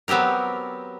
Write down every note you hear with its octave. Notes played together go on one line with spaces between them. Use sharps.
F#3 B3 C4 G4 A#4